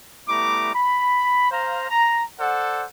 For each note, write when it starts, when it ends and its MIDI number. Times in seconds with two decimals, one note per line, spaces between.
0.28 0.71 55
0.28 0.71 57
0.28 0.71 59
0.28 0.71 64
0.28 0.71 82
0.28 0.71 86
0.74 1.50 83
1.51 1.87 72
1.51 1.87 77
1.51 1.87 82
1.89 2.22 82
2.39 2.84 69
2.39 2.84 72
2.39 2.84 74
2.39 2.84 78